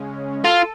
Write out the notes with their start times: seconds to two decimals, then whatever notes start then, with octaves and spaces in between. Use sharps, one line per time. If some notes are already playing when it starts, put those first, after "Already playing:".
Already playing: C#3 G#3 C#4
0.44 F4 A4